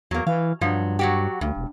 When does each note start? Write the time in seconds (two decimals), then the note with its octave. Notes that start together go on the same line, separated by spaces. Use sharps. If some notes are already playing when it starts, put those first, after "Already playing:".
0.11 E2 F#3 A#3
0.27 E3 F5
0.61 G2 F3 F#3
0.99 F#3 F#4 G4
1.41 D2 G2
1.57 E1